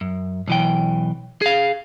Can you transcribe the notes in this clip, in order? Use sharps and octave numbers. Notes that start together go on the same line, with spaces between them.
F#2
B1 E3 G5
G#4 F5